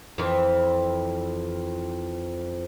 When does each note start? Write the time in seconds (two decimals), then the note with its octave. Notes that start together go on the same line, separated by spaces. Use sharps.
0.18 F2 E3